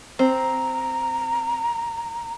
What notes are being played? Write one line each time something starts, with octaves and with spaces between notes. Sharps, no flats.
C4 A#5